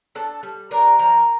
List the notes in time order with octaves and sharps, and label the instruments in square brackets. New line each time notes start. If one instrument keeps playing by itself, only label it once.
[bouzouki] D4 A4 A5
G3
D4 A#4 A#5
F3 A#4 A#5